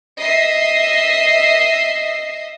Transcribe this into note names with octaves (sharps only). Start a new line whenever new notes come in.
D#5 E5 C7